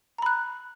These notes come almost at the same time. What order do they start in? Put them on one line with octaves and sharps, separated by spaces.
A#5 B5 F#6